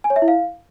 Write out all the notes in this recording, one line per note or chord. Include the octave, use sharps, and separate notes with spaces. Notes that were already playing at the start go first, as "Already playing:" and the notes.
G#5
C#5
E5
E4
F5